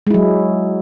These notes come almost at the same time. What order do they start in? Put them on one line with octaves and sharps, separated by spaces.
G#3 E4 F#3